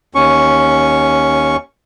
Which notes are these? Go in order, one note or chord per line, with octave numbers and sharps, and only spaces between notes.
D#2 C#4 C#6